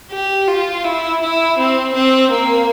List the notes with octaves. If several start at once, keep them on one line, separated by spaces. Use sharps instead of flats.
G4
F4
E4
E4
C4
C4
A#3